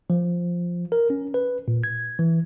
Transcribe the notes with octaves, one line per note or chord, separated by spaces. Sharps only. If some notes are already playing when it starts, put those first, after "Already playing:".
F3
A#4
C#4
B4
A#2
G#6
E3